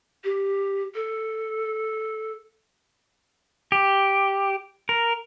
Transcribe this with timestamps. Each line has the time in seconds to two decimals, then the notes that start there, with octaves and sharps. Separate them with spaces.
0.24 G4
0.95 A4
3.72 G4
4.89 A#4